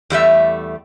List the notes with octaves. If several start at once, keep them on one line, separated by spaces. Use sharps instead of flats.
E2 G3 A3 E5